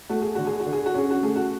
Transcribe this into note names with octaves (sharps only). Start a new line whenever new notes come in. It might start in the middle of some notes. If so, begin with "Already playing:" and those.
A3 F#4
G#4
D3 F#4
G#4
F#4
D3
G#4
F#4
C#4 G#4
F#4
A3 G#4
F#4